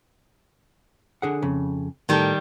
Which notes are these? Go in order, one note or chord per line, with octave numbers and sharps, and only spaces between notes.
D3 G#4 F#5
F2 C#3
A2 D#3 G3 A4